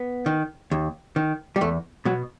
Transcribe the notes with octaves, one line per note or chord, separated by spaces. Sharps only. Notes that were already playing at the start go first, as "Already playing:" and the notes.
Already playing: B3
D#3
D#2
D#3
G3
E2 A3
B2 F#3